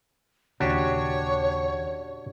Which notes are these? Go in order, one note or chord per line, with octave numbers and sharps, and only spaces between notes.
D#2 A#2 C#3 D4 F#4 G4 C#5